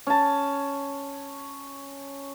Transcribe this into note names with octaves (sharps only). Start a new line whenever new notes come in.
C#4 A5